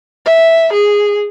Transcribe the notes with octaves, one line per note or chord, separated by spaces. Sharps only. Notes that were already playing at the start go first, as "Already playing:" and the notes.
E5
G#4